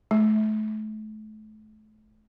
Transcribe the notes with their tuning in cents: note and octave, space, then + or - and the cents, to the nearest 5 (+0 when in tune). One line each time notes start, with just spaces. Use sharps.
A3 -35